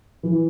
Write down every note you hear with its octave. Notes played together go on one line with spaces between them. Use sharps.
E3